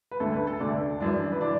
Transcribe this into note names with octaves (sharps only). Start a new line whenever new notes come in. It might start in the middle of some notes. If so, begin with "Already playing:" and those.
B4
D2 D3 A3 A4
B4
A4
D2 D3 A3 D5
F#2 E3 D4
B4
E3 D4 D5